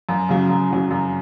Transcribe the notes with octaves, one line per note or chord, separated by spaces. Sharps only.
F#2
C#3 F#3
F#2
C#3 F#3
F#2